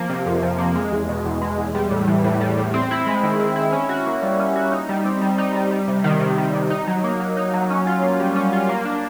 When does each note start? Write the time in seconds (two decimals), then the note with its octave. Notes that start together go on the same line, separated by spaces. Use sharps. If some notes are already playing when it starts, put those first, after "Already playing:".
Already playing: F3 A#3
0.09 C3
0.26 F2
0.43 F3
0.59 A#3
0.75 G#3
0.91 E2
1.09 B2
1.25 E2
1.42 G#3
1.58 E2
1.75 G3
1.91 A2
2.07 E3
2.24 A2
2.41 G3
2.57 A2
2.74 C4
2.91 E4
3.06 G#3
3.23 D#3
3.40 C4
3.56 E4
3.72 C#4
3.89 F#4
4.06 A#3
4.22 G3
4.40 C#4
4.56 F#4
4.72 D#4
4.89 G3
5.05 C4
5.22 G3
5.38 D#4
5.55 G3
5.71 G3
5.88 C3
6.04 D#3
6.20 C3
6.38 G3
6.54 C3
6.70 D#4
6.87 F#3
7.04 A#3
7.20 F#3
7.37 D#4
7.54 F#3
7.70 C#4
7.87 F4
8.03 A#3
8.20 G3
8.36 C#4
8.53 F4
8.69 A#3
8.85 D4